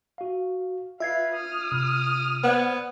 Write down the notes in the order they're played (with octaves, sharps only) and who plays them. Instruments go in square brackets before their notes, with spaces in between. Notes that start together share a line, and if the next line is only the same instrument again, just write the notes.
[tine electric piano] F#4 F5
[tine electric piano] F4 G#6 C7 [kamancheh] B4 F5 [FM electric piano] E5
[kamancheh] D#6 F6
[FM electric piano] C3
[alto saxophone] B3 [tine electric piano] C5 D5 G#6 [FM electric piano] F#5